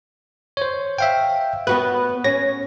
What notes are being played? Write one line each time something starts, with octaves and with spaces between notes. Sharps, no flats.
C5 C#5
E5 F5 G5
B3 F#4 B4 F#6
C#4 A#6